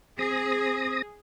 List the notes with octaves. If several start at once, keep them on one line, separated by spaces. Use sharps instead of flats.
C4 G#4 D#6 A#6